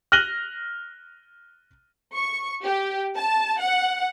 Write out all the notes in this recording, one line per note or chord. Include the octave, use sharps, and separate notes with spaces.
F6 F#6 A#6 D#7 F#7 G7
C#6
G4
A5
F#5